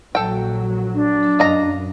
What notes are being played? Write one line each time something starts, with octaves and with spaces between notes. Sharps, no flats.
A#1 F#3 A4 G5
D4
F#2 A#3 D#5 A#5